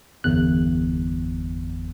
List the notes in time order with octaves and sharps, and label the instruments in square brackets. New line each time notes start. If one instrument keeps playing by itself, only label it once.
[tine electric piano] G1 E2 F#6